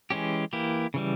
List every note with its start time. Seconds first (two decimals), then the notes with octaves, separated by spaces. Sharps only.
0.10 E3 G#3 C#4 G4
0.53 E3 A#3 E4 G4
0.94 C#3 E3 G3